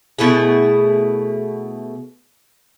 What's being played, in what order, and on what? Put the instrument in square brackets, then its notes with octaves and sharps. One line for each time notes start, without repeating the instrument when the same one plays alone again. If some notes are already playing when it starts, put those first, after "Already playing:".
[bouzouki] B2 A3 E4 G#4